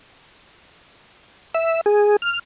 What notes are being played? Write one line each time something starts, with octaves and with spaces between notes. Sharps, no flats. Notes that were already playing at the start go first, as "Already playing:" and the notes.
E5
G#4
F6